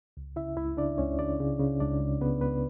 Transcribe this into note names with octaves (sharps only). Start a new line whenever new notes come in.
C#2
C#3 E4 E5
C#2 E4 E5
C#3 D4 D5
C#2 C#4 C#5
C#3 D4 D5
C#3
C#3
C#2 D4 D5
C#2
C#3 B3 B4
C#2 B3 B4